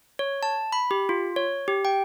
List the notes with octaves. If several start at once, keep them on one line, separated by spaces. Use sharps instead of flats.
C#5
A5
B5
G4
F4
C#5
G4
G5